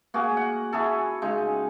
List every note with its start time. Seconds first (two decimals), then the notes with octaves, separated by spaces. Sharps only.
0.14 A#3 F#4 G#4 D6
0.37 F#5
0.73 E4 F#4 G#4 A4
1.22 C#3 G#3 D#4